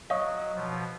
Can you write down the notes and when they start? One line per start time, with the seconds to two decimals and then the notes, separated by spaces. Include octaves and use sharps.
0.10 F#3 C#5 D#5 F5
0.55 B2 F3